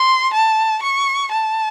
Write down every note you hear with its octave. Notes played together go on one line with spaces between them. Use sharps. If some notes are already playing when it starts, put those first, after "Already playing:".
Already playing: C6
A5
C#6
A5